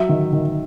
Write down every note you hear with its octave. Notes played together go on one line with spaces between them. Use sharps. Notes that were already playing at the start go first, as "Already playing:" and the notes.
Already playing: F#3 E5
D#3
D#3